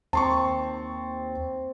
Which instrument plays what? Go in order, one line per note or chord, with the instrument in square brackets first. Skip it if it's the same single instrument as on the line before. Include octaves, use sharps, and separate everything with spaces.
[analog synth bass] D#2 [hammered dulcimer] C4 [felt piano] A5 C6 C#6